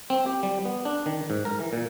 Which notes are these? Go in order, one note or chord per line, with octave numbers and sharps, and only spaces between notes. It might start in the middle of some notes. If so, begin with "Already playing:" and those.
C4
G4
G3
B3
D4
D#3
G#2
A#4
E3
A#2